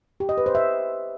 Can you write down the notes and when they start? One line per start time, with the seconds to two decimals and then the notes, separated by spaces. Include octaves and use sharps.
0.20 G4
0.29 D#5
0.38 B4
0.46 C5
0.55 E5